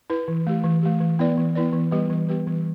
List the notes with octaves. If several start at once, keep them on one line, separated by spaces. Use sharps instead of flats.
E4 B4
E3
A3 G4
E3
A3 G4
E3
B3 E4 B4 D5
E3
B3 E4 B4 D5
E3
G3 B3 G4 B4
E3
G3 B3 G4 B4
E3